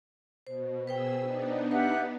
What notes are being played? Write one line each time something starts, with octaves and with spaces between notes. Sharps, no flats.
B2 C5
B2 G#4 B4 C5 G5 E6
B3 D4 D#4
G4 B4 E5 F#5